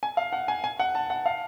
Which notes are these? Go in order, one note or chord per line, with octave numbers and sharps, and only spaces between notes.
G#5
F5
F#5
G#5
G#5
F#5
A5
F#5
F5